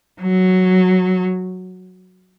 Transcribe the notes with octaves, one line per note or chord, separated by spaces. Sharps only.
F#3